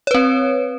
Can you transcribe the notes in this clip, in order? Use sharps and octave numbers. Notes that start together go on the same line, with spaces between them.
C4 B4 C#5